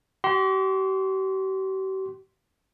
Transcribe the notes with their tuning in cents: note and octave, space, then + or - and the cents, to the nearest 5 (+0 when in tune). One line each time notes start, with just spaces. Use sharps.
G4 -45 C6 +5